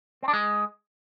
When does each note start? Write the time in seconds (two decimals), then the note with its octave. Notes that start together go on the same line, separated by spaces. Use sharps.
0.23 C4
0.28 D4
0.33 G#3